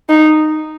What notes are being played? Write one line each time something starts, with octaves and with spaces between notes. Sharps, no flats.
D#4